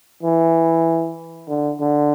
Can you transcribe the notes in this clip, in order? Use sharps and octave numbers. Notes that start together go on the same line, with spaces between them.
E3
D3
D3